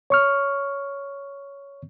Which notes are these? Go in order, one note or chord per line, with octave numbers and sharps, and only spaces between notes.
C#5 C#6 F6